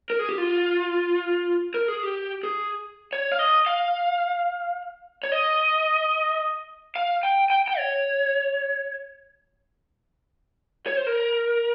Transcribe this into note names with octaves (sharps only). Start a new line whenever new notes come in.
A#4
G#4
G4
F4
A#4
G#4
G4
G#4
C#5
F5
D#5
F5
C#5
D#5
F5
G5
G5
G5
C#5
C#5
C5
A#4